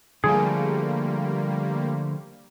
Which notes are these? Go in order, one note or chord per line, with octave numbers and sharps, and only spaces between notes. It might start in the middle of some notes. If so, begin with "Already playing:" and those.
D3 F3 G3 A3 A#3 G#4